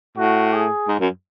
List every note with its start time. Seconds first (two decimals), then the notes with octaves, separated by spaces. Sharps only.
0.18 A2 F#4
0.54 G#4
0.88 G#2
1.00 F#2